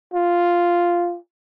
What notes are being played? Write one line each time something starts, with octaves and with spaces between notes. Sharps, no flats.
F4